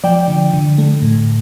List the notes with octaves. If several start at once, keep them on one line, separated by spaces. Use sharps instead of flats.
F3 D5 G5
D3
D3
A3
A2